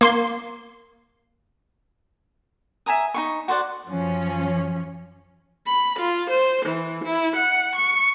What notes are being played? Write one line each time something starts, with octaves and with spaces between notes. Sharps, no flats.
A#3 C6
E5 G#5 A#5 D#6
D#4 F4 C#6
F#4 C5 D5 F#5
F#2 F3 C#4
B5
F4
C5
E3
E4
F#5
C#6